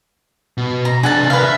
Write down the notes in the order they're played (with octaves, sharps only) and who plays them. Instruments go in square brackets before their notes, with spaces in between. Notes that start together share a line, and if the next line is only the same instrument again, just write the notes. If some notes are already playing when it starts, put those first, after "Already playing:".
[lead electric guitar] B2
[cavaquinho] A#5
[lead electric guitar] C3 D4 [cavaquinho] G#4 F#5 A5
[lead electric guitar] D3 A#4 [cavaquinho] B4 F5
[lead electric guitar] E5